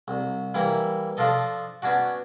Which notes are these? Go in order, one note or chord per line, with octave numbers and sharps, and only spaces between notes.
C2
E3 G3 A#3 E4
F3 D4 F4 A4 D#5
B3 C#4 D4 F#4